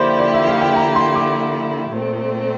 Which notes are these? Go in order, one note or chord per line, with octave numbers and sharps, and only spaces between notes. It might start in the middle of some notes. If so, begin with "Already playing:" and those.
Already playing: D3 F3 A#3 E4 G4 C5 D5
D5
E5
F5
G5
A#5
C6
D6
A#2 A3 C4